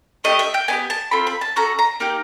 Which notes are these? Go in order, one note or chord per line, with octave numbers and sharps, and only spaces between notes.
A3 D4 G4 D#5
E5
G5
B3 D#4 G4 G#5
A5
C4 F4 A4 B5
B5
A5
C#4 F#4 A4 A#5
A#5
A#3 D#4 G4